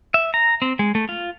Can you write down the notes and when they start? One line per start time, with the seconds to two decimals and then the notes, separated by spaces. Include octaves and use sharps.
0.14 E5
0.34 A#5
0.62 C4
0.79 G#3
0.95 A3
1.09 F4